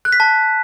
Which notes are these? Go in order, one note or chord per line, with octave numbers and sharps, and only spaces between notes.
F#6
B6
A5